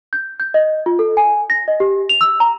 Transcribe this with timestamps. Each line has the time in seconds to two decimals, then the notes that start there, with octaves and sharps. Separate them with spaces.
0.13 G6
0.40 G6
0.54 D#5
0.86 F4
0.99 A4
1.17 G#5
1.50 A#6
1.68 D#5
1.80 G4
2.09 F7
2.21 E6
2.40 A#5